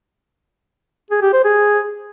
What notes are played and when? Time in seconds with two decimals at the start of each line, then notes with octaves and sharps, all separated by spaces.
1.11 G#4
1.22 G4
1.33 C5
1.44 G#4